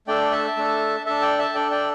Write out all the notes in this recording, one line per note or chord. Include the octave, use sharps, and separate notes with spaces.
A3 D4 A4 D5 G5
E5 A5
A3 D4 A4
D4 A4 E5 A5
D5 G5
E5 A5
D4 A4 D5 G5
D5 G5